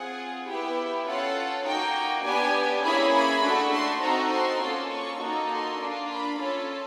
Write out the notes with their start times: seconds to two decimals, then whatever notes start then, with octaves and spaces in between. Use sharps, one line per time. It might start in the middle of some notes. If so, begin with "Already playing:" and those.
Already playing: C4 F4 G#4 F#5
0.48 B3 E4 G4 G5
1.07 C#4 F4 A4 F#5
1.66 A#3 D#4 F#4 G5
2.26 B3 D4 G4 G#5
2.84 A#3 C#4 E4 G#4 B5
3.14 B5
3.43 A3 D4 F#4 A4
3.73 C6
4.02 C4 D#4 F#4 A4 A#5
4.32 C6
4.62 A#3 C#4 F4 A4
4.91 C#6
5.20 A#3 D#4 F#4 A4
5.50 C6
5.79 A#3 D4 F4
6.09 B5
6.38 C#4 F4 A4